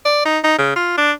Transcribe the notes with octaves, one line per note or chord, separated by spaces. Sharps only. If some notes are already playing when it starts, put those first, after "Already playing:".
D5
D#4
D#4
C#3
F4
D4